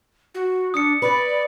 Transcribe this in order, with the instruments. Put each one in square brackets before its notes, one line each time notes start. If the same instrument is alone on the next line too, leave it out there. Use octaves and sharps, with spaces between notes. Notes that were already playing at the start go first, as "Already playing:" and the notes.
[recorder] F#4
[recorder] D4 [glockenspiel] D#6 C#7
[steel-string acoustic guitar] B4 [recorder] D5